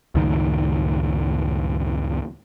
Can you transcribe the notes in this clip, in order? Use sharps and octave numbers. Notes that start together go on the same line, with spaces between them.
C#2 F#2 A2 D#3